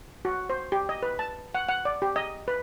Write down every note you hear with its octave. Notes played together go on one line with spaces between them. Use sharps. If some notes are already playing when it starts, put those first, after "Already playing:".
F#4
C5
G4
D#5
B4
A5
F#5
F#5
D5
G4
D#5
B4